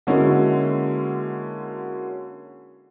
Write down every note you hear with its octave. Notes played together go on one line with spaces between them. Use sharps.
D3 G#3 A#3 C#4 E4 F#4